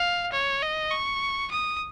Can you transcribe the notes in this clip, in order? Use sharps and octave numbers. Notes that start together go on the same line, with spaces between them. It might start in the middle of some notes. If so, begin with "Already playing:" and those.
Already playing: F5
C#5
D#5
C#6
D#6